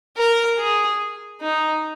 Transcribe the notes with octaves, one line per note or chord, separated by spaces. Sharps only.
A#4
G#4
D#4